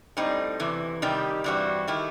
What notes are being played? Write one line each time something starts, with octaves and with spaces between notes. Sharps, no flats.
A2 G3 C4 D#4
E2 C3 E3
C3 D#3 G3 D#4 G4
G2 E3 G3 C4 F#4
D#3 A3 E4 G4